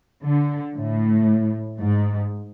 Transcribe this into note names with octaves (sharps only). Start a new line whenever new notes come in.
D3
A2
G#2